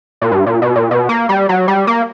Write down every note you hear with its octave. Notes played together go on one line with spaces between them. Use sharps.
A#2
G2
A#2
B2
A#2
B2
A#3
G3
F#3
G3
A#3